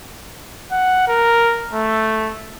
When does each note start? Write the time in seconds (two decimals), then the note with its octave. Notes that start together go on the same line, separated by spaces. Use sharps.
0.71 F#5
1.07 A#4
1.73 A3